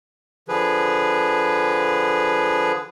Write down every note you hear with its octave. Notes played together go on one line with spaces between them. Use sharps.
D3 F3 G#4 B4